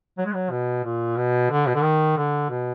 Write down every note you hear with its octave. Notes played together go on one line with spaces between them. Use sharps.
F#3
G#3
F#3
B2
A#2
B2
D3
B2
D3
D#3
D3
B2